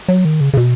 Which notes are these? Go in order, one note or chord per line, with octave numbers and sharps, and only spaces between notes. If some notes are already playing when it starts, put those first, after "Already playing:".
F#3
D#3
C#3
C#3
B2